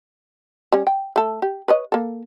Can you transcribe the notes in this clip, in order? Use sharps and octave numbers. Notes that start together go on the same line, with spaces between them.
G3 C#4
G5
A3 A4
G4
B4 C#5 D#5
A#3 A4